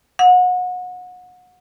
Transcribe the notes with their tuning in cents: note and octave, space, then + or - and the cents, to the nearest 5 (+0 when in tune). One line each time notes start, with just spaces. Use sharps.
F#5 -30